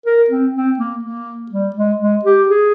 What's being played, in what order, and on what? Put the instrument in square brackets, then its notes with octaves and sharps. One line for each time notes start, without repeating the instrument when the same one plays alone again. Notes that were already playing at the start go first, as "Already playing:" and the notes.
[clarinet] A#4
C4
C4
A#3
A#3
G3
G#3
G#3
G4
G#4